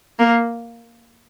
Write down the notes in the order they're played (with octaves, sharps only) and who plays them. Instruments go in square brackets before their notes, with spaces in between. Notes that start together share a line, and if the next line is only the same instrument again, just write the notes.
[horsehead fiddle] A#3